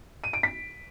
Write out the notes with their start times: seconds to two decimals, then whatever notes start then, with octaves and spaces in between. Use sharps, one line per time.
0.24 D#7
0.33 D7
0.43 B6